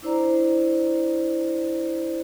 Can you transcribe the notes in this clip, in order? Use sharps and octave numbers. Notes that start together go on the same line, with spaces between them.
D4 E4 C5 D5 A#5